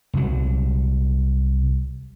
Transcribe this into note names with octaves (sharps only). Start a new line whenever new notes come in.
C2 F#3